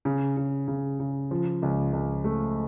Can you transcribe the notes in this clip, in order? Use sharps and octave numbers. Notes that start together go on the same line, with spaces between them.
C#3
C#3
C#3
C#3
F3
C#2
C#2
A3